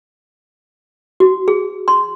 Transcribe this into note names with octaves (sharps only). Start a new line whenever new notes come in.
F#4
G#4
C6